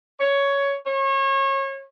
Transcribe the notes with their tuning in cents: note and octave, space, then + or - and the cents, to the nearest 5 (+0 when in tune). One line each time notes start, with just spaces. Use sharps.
C#5 +10
C#5 -30